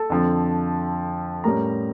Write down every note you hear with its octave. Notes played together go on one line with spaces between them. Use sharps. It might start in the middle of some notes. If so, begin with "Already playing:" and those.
Already playing: A4 A5
F2 D3 F3
A2 G3 C#4 A#4 A#5